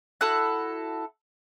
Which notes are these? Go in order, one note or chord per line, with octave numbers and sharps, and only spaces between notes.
E4 F#4 A4 F#6